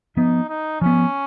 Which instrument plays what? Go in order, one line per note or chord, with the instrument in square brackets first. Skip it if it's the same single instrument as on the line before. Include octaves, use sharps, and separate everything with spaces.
[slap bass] F3 B3 [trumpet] D#4
[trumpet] D#4
[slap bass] F3 B3 [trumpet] C#4